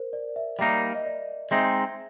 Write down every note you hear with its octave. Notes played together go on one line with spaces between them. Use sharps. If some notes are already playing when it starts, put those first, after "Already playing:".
Already playing: A#4 C5
D5
E5
G3 A#3 D#4 E5
D#5
D5
G#3 C4 D#4 E5